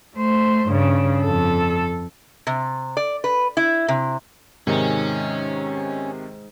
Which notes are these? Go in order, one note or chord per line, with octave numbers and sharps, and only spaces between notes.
A3 C5
G2 C#3
F2 A4
C3
D5
B4
E4
C3
G#2 C3 D#3 C#4 D#5